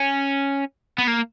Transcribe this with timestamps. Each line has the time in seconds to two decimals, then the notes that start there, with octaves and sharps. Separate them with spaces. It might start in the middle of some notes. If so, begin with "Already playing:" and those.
Already playing: C#4
0.98 B3
1.08 A#3